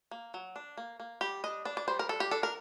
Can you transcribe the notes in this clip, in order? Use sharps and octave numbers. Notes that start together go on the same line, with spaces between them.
A#3
F#3
D4
A#3
A#3
G3 G4
D4 D#5
D4 D5
D5
G3 C5
A#4
D4 A4
G4
D4 A4
A#4